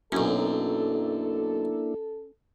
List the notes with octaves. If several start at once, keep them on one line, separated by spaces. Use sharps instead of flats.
B1 F#2 A#3 C#4 D4 E4 A4